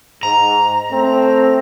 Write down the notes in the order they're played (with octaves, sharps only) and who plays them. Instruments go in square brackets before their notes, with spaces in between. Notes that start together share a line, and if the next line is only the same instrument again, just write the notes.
[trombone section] G#2 [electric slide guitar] A#5
[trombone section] A3 C4